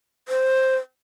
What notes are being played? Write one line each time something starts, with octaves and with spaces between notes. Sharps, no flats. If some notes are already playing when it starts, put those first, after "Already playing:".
C5